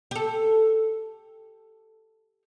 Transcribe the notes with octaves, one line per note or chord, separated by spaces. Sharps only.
G4 A4